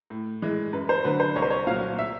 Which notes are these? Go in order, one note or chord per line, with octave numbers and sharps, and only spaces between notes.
A2
E3 G#3
F#2 B4
C5
D3 F#3 B4
C5
C2 C#5
C5
C#5
A#2 F#3 F5
E5